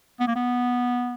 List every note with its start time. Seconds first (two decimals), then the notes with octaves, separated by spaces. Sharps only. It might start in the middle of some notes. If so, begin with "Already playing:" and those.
0.20 B3
0.27 A#3
0.36 B3